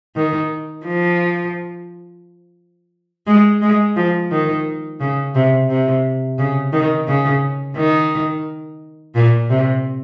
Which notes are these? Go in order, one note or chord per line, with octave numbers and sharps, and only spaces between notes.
D#3
F3
G#3
G#3
F3
D#3
C#3
C3
C3
C#3
D#3
C#3
D#3
A#2
C3